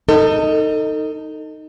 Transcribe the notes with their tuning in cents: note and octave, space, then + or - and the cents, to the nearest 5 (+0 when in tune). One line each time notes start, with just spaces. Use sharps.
D#4 +0 A4 +35